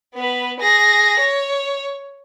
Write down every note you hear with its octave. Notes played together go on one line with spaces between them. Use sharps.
B3 B4
G#4 A#6
C#5